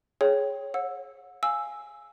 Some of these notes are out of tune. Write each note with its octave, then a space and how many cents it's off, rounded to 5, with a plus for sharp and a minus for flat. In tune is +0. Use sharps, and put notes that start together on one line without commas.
G#4 +15 C#5 +0 G5 +0
C#5 -40 F#5 -30 E6 +0
F5 +0 G#5 +0 E6 +0